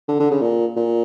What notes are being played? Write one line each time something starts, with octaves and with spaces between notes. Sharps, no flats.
D3
D3
C#3
A#2
A#2